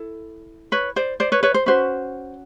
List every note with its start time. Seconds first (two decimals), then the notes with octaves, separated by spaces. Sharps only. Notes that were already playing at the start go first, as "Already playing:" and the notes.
Already playing: E4 A4
0.72 B4 C#5
0.96 C5 D5
1.20 C5 D5
1.32 B4 C#5
1.43 B4 C#5
1.54 C5
1.66 C#4 F#4 B4 C5